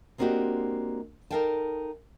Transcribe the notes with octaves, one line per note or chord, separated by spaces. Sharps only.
G#3 A#3 C4 D4 F#4 G4
D#4 A4 A#4 F5 G5 A5